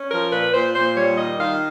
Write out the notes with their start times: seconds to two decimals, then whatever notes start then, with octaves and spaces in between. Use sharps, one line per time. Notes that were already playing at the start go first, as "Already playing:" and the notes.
Already playing: C#4
0.11 F3 A#4
0.32 A#2 B4
0.54 A#2 C5
0.75 A#2 C5
0.96 G3 C#5
1.18 D#3 D#5
1.39 D#3 F5